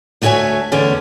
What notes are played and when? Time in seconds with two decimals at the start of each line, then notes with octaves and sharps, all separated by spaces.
0.22 D2 A3 F#4 C#5 E5 G#5
0.72 E2 D3 A3 C#4